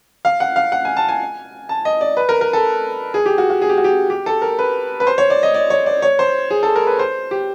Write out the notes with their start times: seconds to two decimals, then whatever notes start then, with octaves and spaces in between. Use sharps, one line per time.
0.25 F5
0.40 F#5
0.56 F5
0.72 F#5
0.85 G#5
0.97 A5
1.08 G#5
1.69 A5
1.85 D#5
2.01 D5
2.17 B4
2.29 A#4
2.41 A#4
2.53 A4
3.14 G#4
3.26 G4
3.38 F#4
3.50 F#4
3.62 G#4
3.69 G4
3.77 F#4
3.84 G4
4.10 G4
4.26 A4
4.42 A#4
4.59 B4
5.00 B4
5.07 C5
5.18 C#5
5.30 D5
5.43 D#5
5.54 D5
5.70 C#5
5.86 D5
6.02 C#5
6.19 C5
6.51 G#4
6.63 A4
6.76 A#4
6.87 B4
6.99 C5
7.31 G4